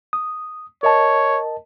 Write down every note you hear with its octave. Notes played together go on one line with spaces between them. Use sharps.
D#6
A#4 C#5 D#5 A5